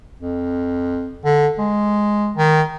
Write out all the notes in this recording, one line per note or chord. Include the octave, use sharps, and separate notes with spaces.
F2
D3
G#3
D#3